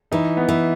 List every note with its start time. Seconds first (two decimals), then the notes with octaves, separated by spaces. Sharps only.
0.12 E3 D#4
0.37 B3
0.49 E3